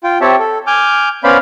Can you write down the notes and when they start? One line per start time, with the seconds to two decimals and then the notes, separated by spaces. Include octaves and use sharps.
0.04 F4 G5
0.21 C4 G4 C#5 E5 A5
0.40 A4
0.67 G#5 D6 F6 G6
1.24 B3 C#4 C5 D5 F5 B5